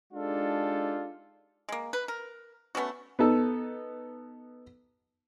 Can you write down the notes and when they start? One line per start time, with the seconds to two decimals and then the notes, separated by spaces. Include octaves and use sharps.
0.13 G#3 D4 D#4 F4 G4 A4
1.69 G#3 A#3
1.93 B4
2.08 A#4
2.75 A3 B3 C#4 F#4
3.19 B3 D#4 A4